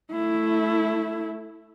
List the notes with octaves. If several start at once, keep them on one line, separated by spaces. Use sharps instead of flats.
A3 E4